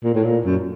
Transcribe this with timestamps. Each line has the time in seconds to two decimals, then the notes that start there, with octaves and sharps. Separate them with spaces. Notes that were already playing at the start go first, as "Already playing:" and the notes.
0.04 A#2
0.14 A2
0.24 A#2
0.45 F#2